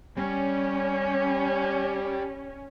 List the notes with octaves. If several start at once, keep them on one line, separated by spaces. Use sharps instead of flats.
G3 C#4